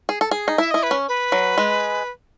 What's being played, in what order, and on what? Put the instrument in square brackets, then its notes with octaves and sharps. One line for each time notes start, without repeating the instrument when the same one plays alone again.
[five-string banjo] G#4
A4
G#4
D#4
[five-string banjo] E4 [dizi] E5
[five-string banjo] E4 [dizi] D#5
[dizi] B4
[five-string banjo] C#4
[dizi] B4
[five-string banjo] F#3
G#3